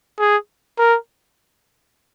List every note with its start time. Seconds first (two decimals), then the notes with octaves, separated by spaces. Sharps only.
0.19 G#4
0.78 A#4